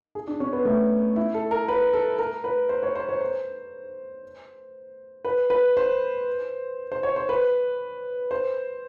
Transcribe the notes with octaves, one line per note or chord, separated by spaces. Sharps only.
G#4
D4
C#4
B3
A3
E4
A4
A#4
B4
A4
A#4
B4
C5
C#5
C5
C#5
C5
B4
B4
C5
C5
C#5
C5
B4
C5